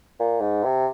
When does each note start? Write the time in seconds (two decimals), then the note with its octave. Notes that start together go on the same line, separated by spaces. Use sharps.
0.19 A#2
0.40 G#2
0.63 C3